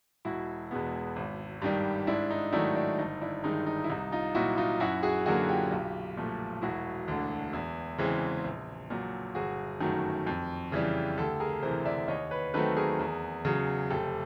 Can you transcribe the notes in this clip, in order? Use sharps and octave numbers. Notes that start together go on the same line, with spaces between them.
E1 E4 F#4
E2 B2 G#3 B3
G#1
G2 D#3 G3
G#2 D4 E4
D#4
D#3 F#3 A3 D4 E4
D4
G1 D#4
D4 E4
G2 D#3 G#3 D#4
D#4
E4
C2 D#4
D#4 F4
A#2 F#3 E4 F#4
D#4 F4
F#2 E4 F#4
F#4 G#4
D3 F#3 A#3 F#4 G#4
F4 G4
B1
A#2 F3 A3
E1 E4 F#4
D2 D3
E2
C#3 E3 G#3 C4
A#1
A#2 F#3
G1 F#4 G#4
F#2 D#3 F#3 A3
F2
C#3 E3 G3
D2 G4 A4
G#4 A#4
C3 E3 A#4 C5
D5 E5
D#2 C#5 D#5
B4 C#5
D#3 F#3 A3 C4 A4 B4
G#4 A#4
E2
C#3 F#3
F1 G4 A4